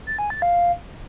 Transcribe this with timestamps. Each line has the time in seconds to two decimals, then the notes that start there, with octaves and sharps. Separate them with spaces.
0.07 A6
0.19 G#5
0.30 A6
0.42 F5